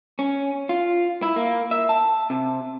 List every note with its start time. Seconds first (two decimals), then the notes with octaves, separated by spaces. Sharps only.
0.19 C#4
0.69 F4
1.23 E4
1.36 A#3
1.71 E5
1.89 A5
2.30 C3